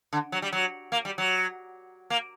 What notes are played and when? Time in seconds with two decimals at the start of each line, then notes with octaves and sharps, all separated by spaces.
0.13 D3
0.32 F#3
0.42 G3
0.53 F#3
0.92 A#3
1.05 G3
1.18 F#3
2.10 A#3